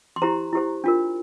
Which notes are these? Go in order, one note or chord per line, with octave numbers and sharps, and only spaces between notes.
C6
E4 G4 C5 A#5
E4 G4 C5
D4 F4 A#4